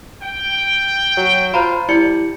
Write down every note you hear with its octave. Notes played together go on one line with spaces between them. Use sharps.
G5
F#3
F4 C5 A#5 B5
G3 E4 D5 C#7